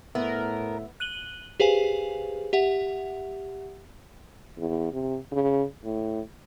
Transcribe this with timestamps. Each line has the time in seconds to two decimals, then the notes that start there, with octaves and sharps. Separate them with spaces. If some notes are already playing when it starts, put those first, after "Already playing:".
0.15 A2 B3 A#4 E5
1.00 F#6 D#7 F#7 G7
1.60 G4 G#4 B4 C5 F5 G#5
2.53 G4 E5 F#5
4.57 E2
4.93 C3
5.32 C#3
5.84 A2